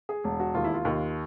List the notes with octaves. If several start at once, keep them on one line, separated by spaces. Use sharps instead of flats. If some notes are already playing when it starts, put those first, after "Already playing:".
G#4
E1
F#4
D#2 F4
E4
F4
D#2